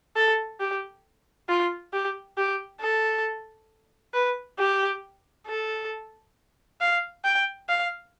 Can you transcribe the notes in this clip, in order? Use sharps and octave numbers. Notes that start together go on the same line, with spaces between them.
A4
G4
F4
G4
G4
A4
B4
G4
A4
F5
G5
F5